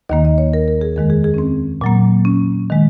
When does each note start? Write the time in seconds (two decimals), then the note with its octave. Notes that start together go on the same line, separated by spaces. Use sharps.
0.09 D#2 D#3 A#3 D#5
0.25 D#5
0.38 C#5
0.53 A#4
0.68 A#4
0.81 G#4
0.96 F2 D#3 G#3 A#4
1.10 G#4
1.24 G#4
1.34 C#4
1.38 C4
1.81 A#2 F#3 A#3
2.25 C#4
2.70 D#3 G#3